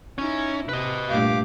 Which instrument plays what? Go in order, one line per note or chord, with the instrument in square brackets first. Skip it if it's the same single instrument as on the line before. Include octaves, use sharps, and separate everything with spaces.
[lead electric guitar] C#4 [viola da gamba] D#4 E4
[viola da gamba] C3 [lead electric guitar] B4 D#5
[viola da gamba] G2 A#2 A3 [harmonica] G4 F5 D6